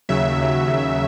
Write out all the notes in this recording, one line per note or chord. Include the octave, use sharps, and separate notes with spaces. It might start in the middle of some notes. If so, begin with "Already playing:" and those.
D#2 C#3 F#3 E5
D#2 C#3 F#3
D#2 C#3 F#3